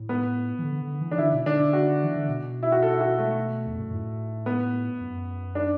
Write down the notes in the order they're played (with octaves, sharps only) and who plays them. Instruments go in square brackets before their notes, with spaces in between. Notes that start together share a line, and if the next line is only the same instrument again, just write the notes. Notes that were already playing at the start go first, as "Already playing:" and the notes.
Already playing: [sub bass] A2
[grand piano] B3
[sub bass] E3
D3
D3
E3
[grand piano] D4
[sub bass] D3 [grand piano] E4
[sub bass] B2
[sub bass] D3 [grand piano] D4
[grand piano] F#4
[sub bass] E3
D3
B2
[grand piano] E4
F#4
A4
E4
F#4
A3
[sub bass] E2
F#2
A2
[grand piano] B3
[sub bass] F#2
[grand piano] D4